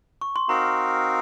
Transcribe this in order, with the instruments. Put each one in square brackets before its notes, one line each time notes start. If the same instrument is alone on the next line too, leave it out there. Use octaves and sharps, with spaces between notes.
[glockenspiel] C#6
C6
[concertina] C4 D#4 F#4 A#4 F5 [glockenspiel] A#5